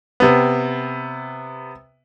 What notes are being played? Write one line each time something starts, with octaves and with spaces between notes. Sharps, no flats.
C3 B3